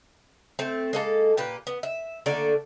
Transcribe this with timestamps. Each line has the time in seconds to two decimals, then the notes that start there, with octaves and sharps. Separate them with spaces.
0.59 A3 C4
0.93 G#3 A#3 A4
1.37 A#2 G4 B4
1.67 B3
1.83 E5
2.26 D3 A3 A#3 D5